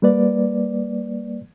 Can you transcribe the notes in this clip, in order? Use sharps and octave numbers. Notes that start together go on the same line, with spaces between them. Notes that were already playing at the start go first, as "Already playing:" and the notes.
G3 A#3 B4 D5